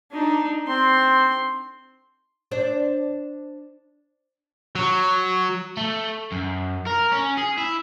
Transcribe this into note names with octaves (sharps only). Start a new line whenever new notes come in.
D4 D#4
C4 C6
D4 C5 D5
F#3
A3
F#2
A#4
C#4
G#4
E4